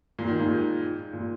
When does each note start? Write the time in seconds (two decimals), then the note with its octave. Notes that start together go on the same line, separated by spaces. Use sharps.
0.19 A#2
0.28 D#3
0.40 A#2
0.50 G#2
1.13 A#2